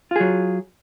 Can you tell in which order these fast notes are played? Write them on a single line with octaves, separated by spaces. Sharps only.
F4 G#4 F#3